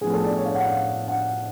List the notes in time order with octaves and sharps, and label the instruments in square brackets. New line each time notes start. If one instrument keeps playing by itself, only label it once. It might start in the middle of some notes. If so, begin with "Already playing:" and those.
[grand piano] A2 F3 B3 G#4
A4
D5
C#5
F5
F#5
F5
F#5